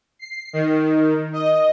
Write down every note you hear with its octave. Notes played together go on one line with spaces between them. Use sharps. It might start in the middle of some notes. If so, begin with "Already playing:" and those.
C7
D#3
D#5